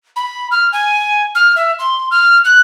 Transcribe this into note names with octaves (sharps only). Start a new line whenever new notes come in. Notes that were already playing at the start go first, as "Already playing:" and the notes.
B5
F6
G#5
F6
E5
C6
F6
F#6